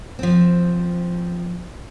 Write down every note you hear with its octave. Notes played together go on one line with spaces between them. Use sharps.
F3 C4